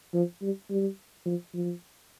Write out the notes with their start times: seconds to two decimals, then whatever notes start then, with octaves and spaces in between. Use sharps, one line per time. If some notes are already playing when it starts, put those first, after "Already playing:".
0.14 F3
0.42 G3
0.70 G3
1.26 F3
1.54 F3